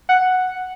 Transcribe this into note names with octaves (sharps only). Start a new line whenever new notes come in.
F#5